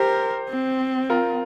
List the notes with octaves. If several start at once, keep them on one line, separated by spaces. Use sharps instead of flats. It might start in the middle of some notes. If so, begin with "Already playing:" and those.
Already playing: G4 A#4 C5
C4
F4 A#4